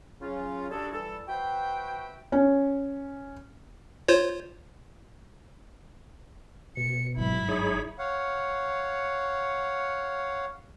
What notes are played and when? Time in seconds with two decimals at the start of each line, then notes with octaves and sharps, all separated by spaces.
0.20 C#3 F#3 C#4 F4
0.71 G3 A3 D4 F#4 G#4 A4
0.92 E3 G3 A4
1.28 F#4 B4 C5 E5 G5
2.32 C#4
4.08 F4 C5 C#5
6.77 B2 C#7
7.17 G1 G#2 F#3 E4 B5
7.49 D#4 G#4 C#5
7.99 C#5 F5 F#5